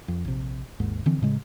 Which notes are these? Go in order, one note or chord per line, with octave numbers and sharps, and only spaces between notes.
F2
A#1 C3
G#1 D#2 G#2
D3 E3 F3 C4
A2 C#3 G#3